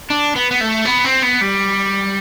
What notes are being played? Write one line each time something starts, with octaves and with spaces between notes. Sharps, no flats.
D4
B3
B3
A3
B3
C4
B3
G3